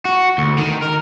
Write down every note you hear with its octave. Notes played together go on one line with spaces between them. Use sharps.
F#4
D2
D#3
A#4